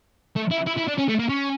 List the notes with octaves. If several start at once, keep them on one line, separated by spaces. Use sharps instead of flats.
A3
E4
E4
E4
D4
C#4
A3
A#3
C#4